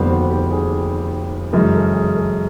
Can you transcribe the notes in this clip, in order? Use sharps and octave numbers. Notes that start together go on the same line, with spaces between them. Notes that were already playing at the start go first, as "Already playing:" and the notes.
Already playing: F1 D#2 D3 G3 B3 C5
F#4
G4
G#4
F#2 C#3 E3 G#3 A#4
A4
G#4
A4